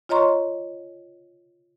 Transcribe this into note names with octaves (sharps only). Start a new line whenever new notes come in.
F4 C#5 D#5 A#5 C6 C#6